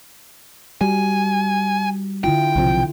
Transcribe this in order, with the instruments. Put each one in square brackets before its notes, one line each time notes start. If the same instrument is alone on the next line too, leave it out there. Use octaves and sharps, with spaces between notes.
[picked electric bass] G3 [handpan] F#4 [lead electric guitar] G#5
[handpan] D3 E4 F4 [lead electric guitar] G5
[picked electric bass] B1 C3 F3